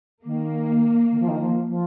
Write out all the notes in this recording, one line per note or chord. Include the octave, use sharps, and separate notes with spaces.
D#3 A#3
D#3
F3
D#3
F3
F3